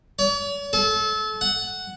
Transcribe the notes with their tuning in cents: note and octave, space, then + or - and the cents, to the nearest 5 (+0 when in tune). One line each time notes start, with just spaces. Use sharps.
C#5 +45
A4 -30
F#5 +5